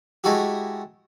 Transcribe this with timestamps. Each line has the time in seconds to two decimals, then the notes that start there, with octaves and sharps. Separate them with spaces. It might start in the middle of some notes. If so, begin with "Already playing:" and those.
0.24 G#3 A3 E4 F#4 G4